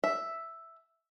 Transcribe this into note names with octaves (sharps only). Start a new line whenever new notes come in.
E5